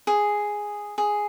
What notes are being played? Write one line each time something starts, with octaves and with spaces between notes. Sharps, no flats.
G#4
G#4